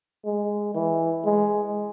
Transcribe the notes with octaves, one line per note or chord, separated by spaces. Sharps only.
G#3
E3
G#3